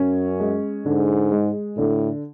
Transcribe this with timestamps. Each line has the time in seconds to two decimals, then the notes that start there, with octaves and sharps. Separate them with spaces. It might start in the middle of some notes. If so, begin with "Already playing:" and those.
Already playing: F#2 C#4
0.40 G#3
0.86 G#2 D3
1.32 G#3
1.77 A2 D3